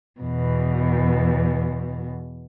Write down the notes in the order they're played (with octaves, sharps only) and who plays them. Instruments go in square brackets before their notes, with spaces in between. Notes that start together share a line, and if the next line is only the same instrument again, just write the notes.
[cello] E2 B2